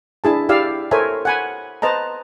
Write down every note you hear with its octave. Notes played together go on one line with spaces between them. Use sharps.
D4 E4 G#4 A5
E4 G4 D5 F5 E6
A4 A#4 C5 C#5 E5 G#5
F#5 G#5 B5
B4 C5 D#5 A5 A#5